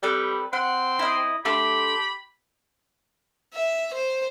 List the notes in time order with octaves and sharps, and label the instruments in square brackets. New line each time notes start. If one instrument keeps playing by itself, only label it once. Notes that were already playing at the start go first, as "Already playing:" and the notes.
[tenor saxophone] G3 [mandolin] C4 A4 B4
[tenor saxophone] C4 [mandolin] F#5 [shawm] C6
[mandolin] E4 D#5
[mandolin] A3 D4 C6 [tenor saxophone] G4 [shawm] B5
[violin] E5
C5